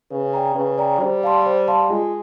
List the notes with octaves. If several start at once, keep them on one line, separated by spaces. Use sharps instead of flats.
C#3 B4
D5 G5 A#5
C#3 B4
D5 G5 A#5
G3 C5
F5 A5 C6
C5
F5 A5 C6
G#3 F4